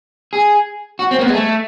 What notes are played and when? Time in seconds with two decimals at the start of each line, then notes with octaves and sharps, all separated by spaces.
0.33 G#4
0.99 F#4
1.11 C4
1.19 A#3
1.21 B3
1.27 G#3
1.34 A3